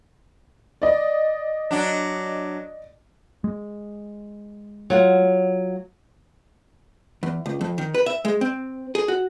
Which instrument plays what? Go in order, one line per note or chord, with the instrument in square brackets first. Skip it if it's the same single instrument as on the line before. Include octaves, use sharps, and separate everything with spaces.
[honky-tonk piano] D5 D#5
[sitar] F#3 D4
[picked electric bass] G#3
[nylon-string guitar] F#3 F4 F#5
[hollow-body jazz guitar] E2
C#2
F2
D#3
B4
E5
G#3
C4
G#4
F#4